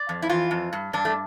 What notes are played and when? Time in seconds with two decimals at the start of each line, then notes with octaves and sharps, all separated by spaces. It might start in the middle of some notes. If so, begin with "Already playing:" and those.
Already playing: D5
0.09 F2
0.22 E4
0.30 E3 F4
0.51 F2
0.73 G2
0.93 G2 D4
1.05 A3